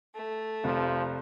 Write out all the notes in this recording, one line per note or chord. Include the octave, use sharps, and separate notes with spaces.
A3
F1 F3